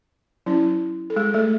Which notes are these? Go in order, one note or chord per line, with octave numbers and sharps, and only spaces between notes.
F#3 C#4 E4
A4
G#3 G#4
A3 A4